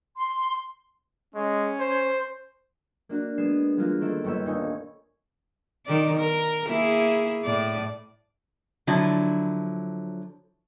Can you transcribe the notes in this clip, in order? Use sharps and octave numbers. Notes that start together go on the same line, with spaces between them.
C6
G#3 C#4
C5
A#3 D4 F#4
G#3 B3 G#6 C7 E7
E3 G3 G#3 A#3 F4 F#4
D#3 A#3 C4 E4 A4 D7
G1 A#3 C#5 G5 B5 E6
D#1 D#4 C#5 G#5
D#3 D5
A#4
A#3 E4 G#4
A2 D5
D3 F3 F#3 E4